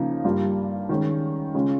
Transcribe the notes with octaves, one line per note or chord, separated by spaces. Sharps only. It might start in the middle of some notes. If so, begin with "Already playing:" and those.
Already playing: C#3 F3 A#3 D#4
G2 G3 A#3 F4
D#3 G#3 C#4
C#3 G#3 C#4 F4